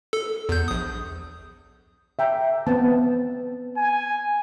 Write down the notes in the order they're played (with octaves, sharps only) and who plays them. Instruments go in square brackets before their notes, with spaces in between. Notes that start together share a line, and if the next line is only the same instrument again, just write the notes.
[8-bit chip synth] A4
E2 G6
A#1 D#6
[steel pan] E5 G5 A#5
B3 C4 A5
[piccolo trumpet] G#5